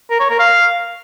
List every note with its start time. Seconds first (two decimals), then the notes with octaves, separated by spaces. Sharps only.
0.10 A#4
0.20 C#5
0.30 A#4
0.39 F5